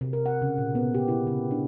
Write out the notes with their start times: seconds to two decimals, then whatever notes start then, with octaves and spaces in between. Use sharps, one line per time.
0.01 C3
0.13 A#4
0.26 F#5
0.42 C#3
0.58 A#2
0.75 B3
0.94 G4
1.08 E4
1.27 C#3
1.51 D4